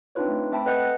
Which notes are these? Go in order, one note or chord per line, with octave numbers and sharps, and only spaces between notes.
C4 D4 D#4 F4 B4 C#5
A3
A3 C4 E5 G5 A5 B5
A4 B4 D#5 F#5 F#6 G6